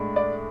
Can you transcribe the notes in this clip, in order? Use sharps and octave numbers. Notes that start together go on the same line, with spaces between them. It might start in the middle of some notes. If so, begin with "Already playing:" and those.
Already playing: A2 G#3 D4
D5